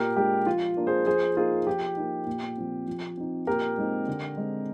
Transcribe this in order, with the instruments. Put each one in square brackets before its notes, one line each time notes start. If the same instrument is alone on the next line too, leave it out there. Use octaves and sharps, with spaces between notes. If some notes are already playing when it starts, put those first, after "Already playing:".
Already playing: [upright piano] A#2 G4 A#4
G#3 D4 G4
F3 F4
A#3 D4
G#4 C5
F3 G#4 C5
A#3 D#4 F4 G#4
F3 G4
A#3 D#4
A#2
F3 C4
F3
C4 D#4
A#2 G4 A#4
G#3 C4 D#4
D3
G#3 C4